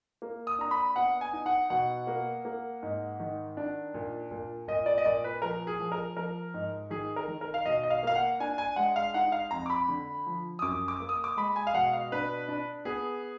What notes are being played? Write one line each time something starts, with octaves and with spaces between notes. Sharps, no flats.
A#3
D#6
D4 A#5
B5
B3 F#5
G#5
D#4
F#5
B2 F#5
A#3
A#3
G#2
D#3
D4
A#2
A#2
A#2 D#5
D5
D#5
A#2 D5
B4
F3 A#4
G#4
F3
A#4
F3 A#4
G#2
D#3 G#4
A#4
D#3
A#4
F5
B2 D#5
D#5
F5
A#3 F5
F#5
D4 G#5
G#5
G#3 F#5
F5
D#4 F#5
F5
F2 A#5
D6
B5
D3
F3
D#6
F#2 D6
D6
A#3
D#6
D6
G#3 B5
G#5
F5
B2 F#5
F5
D4 B4
D4
B3 G#4